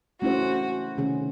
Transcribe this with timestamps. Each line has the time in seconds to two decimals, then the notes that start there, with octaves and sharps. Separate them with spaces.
0.22 A3 C#4 E4 F#4 G#4 C5
0.97 C3 D#3 A3 C#4 G#4